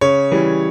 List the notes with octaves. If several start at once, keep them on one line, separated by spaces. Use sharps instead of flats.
C#3 C#5
E3 G3